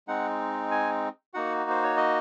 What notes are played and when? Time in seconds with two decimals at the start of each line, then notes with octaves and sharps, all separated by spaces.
0.08 G#3 C4 D#4 F#5
0.71 G#5
1.34 A#3 D#4 F#4 F#5
1.70 C5
1.83 C#5
1.97 D#5